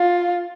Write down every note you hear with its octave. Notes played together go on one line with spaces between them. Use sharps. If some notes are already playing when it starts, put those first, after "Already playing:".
Already playing: F4